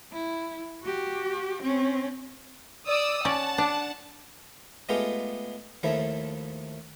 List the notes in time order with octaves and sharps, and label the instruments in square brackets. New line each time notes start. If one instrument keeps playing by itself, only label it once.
[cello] E4
F#4 G4
C4 C#4
[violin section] D5 D#6 E6
[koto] C#4 D5 [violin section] F#5 A5
[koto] D4
[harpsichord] G#3 A3 B3 F4 G4
D#2 F3 A3 E4